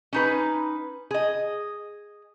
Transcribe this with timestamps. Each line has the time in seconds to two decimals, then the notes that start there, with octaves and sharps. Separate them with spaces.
0.13 C#4 D#4 B4
1.11 G#4 D#5